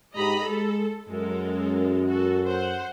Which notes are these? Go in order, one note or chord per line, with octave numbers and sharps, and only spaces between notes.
G#2 G#3 G4 D#5 A#5 B5
G#3 A4
F#2 G#3 A4 A#4
F#4 A4
C5 F#5